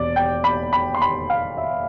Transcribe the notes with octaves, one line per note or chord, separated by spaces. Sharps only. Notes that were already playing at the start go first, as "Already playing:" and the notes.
Already playing: E1 D5
G5
B5
B5
C6
B5
F5
E5